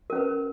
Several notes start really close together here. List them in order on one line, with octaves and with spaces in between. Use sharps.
A#4 C#4 B4